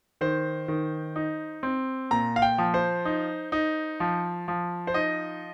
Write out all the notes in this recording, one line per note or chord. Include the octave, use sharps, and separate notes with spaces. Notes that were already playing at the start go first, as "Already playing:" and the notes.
D#3 C5
D#3
D#4
C4
A#2 A#5
F5
G5
F3
C5
D#4
D#4
F3
F3
C5
D#4 D#5